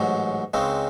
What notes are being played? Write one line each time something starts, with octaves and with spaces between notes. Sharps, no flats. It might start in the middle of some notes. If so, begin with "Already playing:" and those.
Already playing: A1 G#2 F#3
C#2 C#3 G#3 C4 D#4